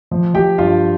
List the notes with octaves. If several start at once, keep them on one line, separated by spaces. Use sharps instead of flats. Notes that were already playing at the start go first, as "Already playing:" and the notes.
F3
F3 G4 G5
G2 F4 F5